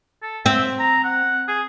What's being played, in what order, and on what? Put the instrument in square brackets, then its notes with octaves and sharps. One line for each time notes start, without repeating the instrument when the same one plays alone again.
[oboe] A4
[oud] C4 [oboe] E5
[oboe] A#5
F#5
G#4